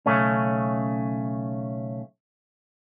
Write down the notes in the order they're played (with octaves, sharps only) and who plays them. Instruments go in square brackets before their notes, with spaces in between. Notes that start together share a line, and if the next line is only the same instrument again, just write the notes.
[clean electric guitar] B1 C#3 A3 C#4